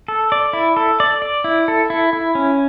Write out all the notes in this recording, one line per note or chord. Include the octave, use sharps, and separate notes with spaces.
A4
D5
E4
A4
D5
D5
E4
A4
E4
E4
C#4